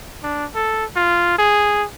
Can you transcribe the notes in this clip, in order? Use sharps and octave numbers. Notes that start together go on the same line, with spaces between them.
D4
A4
F4
G#4